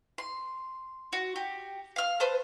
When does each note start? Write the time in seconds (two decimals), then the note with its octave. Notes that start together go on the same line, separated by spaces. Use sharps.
0.18 C6
1.13 F#4
1.36 G4
1.96 F5 F6
2.20 B4 C5 A5